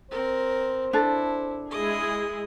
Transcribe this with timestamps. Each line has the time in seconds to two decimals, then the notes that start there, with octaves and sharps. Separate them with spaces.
0.11 C4 A#4 C5
0.93 D4 E4 A4
1.71 G#3 E4 G#4 D#5 D#6